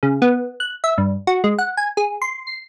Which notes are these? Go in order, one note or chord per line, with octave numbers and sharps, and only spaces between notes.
C#3
B3
F#6
E5
G2
F#4
G#3
F#5
G#5
G#4
C6
C7